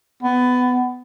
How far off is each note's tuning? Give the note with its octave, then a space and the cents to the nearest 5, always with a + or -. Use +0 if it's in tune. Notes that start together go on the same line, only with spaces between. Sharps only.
B3 +20